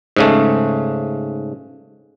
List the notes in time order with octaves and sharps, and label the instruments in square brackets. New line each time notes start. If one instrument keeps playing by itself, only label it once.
[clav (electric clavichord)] G#2 C#3 A3